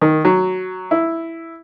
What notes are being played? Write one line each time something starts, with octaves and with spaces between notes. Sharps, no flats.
D#3
F#3
E4